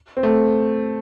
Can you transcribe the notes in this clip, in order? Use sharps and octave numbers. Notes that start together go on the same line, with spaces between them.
C4
A3